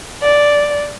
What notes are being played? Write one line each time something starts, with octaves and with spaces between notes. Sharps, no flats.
D5